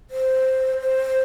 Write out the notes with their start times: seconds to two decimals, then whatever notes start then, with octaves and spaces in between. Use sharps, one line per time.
0.10 C5
0.81 C5